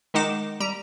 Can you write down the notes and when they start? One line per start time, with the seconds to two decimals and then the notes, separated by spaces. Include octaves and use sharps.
0.14 D#3 G#3 D#4 F#5 D6 E7
0.60 G3 A#5